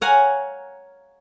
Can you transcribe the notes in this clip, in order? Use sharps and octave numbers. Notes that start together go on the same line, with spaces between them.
C#5 F5 F#5 G#5 A#5